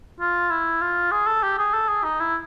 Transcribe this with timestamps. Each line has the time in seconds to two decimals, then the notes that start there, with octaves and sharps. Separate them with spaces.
0.20 F4
0.50 E4
0.82 F4
1.12 G#4
1.27 A4
1.43 G4
1.58 G#4
1.74 A4
1.89 G#4
2.04 D#4
2.20 E4